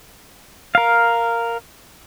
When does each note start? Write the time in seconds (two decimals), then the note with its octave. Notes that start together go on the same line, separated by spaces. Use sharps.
0.75 A#4 F5